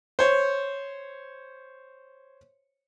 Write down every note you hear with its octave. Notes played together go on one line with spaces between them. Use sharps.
C5 C#5